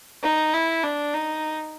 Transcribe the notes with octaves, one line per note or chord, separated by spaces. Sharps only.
D#4
E4
D4
D#4